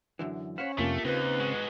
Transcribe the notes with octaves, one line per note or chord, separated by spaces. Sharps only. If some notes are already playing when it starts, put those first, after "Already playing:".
F#2 D3 E3
C#4 C5 C#5 F5 F#5 B5
F2 C3 A3 A#3 F4 G4
D#2 C#3 C4 B4
G#2 G#3 F#4